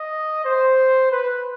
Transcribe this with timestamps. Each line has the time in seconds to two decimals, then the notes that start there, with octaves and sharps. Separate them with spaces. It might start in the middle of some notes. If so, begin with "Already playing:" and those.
Already playing: D#5
0.45 C5
1.11 B4